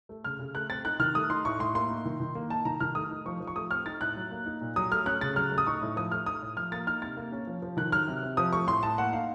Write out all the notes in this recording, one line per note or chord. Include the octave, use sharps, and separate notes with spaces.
A3
C#3 F6
C#3
A3 F#6
C4 A6
D#4 F#6
D#3 F6
A3 D#6
D#4 C6
A2 C#6
A2 C6
A#3 C6
D#4
D#3
D#3
A#3
D#4 A5
D#3 A#5
D#3 F6
A3 D#6
D#4
F3 C#6
F3
C#6
A3 D#6
C4 F6
D#4 A6
A2 F#6
F#3
A#3
D#4
A#2
F#3 D#6
A3 F6
C#4 F#6
C#3 A6
F#3 F6
A3
D#6
D#4 C#6
A2
F3 D#6
A3 F6
D#4 D#6
A2
F3 F6
A#3 A6
D#4 F6
C3 A6
A#3
C#4
F3
F3
D#3 F#6
F#3 F6
C3
C3
F3 D#6
A3 C#6
A2 C6
A2 A5
A#3 F#5
D#4 F5